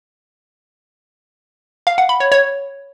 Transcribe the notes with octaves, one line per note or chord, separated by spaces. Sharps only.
F5
F#5
B5
C#5
C#5